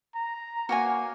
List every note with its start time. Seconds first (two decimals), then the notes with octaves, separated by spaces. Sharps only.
0.15 A#5
0.69 A#3 F#4 C#5 G#5